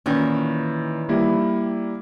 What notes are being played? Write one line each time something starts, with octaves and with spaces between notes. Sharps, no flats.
A#2 D#3 E3 C#4
G3 A#3 E4